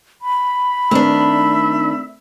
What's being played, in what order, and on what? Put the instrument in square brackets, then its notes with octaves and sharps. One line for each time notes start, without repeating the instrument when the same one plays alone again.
[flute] B5
[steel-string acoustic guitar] D#3 D4 [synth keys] A3 C4 D5 [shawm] E5